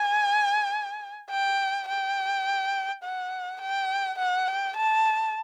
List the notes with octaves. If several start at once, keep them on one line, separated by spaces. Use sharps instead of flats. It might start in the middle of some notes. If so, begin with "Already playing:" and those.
Already playing: G#5
G5
G5
F#5
G5
F#5
G5
A5